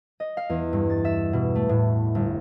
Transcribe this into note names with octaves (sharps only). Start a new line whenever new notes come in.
D#5
F5
E2
G2
A6
E5
B2
A3
A2
G1